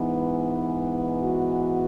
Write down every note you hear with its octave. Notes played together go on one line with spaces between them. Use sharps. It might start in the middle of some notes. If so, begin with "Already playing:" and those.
Already playing: G#2 E3 B3 D#4
F#4